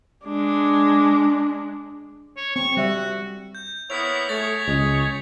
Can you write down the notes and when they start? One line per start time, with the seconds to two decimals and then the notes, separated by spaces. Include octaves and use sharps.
0.25 G#3 D4
2.37 C#5
2.56 C4 C#6
2.77 G3 F#4 E5
3.55 G6
3.90 A#3 B3 E4 C#5 D#6 B6 F7
4.29 A3 G#4 C#5 A6
4.68 C#2 G#3